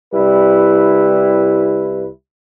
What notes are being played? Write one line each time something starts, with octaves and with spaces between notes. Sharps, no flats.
C2 G3 E4 B4